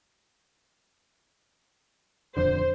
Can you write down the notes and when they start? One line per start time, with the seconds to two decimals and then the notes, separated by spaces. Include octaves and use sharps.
2.37 D#1 F2 D3 C5